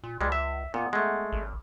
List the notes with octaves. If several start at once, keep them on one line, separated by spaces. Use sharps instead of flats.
A#2
C#2 G3 G#3
E5
A#2 B3
G#3 A3
G#1